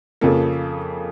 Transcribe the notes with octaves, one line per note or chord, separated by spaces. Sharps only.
F2 C#3 F3 A#3 A4